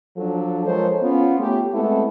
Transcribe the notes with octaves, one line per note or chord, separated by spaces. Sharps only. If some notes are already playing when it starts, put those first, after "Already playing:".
F3 F#3 D4 A4
F3 G#3 A4 A#4 C5 C#5
B3 C#4 F4
A3 G4
G#3 A3 B3 C4 E4 A4